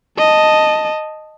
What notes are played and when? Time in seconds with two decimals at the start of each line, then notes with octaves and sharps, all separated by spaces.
0.18 D#5 A5